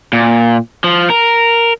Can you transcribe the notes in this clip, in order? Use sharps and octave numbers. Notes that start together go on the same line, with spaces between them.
A#2
F3
A#4